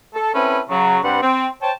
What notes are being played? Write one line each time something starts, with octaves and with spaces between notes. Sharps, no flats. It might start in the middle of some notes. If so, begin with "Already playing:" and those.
A4
C4 C#4 E4 A4 B4
C#3 F#3
G2 G3 C4 B4 F#5
C4
C5 C#5 G5 A5